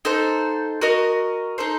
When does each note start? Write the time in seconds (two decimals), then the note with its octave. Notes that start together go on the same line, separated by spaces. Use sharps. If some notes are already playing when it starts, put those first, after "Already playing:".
0.05 D#4 A4 C5 F#5
0.81 F#4 A#4 D#5
1.58 D#4 A4 C5